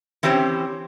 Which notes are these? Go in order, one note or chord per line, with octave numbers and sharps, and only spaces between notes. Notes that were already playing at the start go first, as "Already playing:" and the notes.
E3 C4 C#4 G4 C5